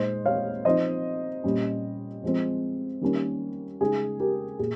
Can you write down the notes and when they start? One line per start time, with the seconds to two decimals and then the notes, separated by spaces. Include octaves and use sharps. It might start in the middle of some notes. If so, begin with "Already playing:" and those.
Already playing: A#2 G#3 D#4 C5 D#5
0.26 C#5 F5
0.65 F3 C4 D#4 C5 D#5
1.44 A#2 G3 C#4
2.23 F3 G#3 C4
3.01 D#3 G3 A#3 C#4
3.80 C#3 G#3 D#4 G#4
4.20 G4 A#4
4.59 A#2 G#4